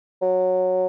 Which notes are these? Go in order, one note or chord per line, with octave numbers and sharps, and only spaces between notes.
F#3